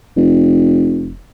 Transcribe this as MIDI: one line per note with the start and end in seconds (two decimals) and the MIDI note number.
0.17 1.21 29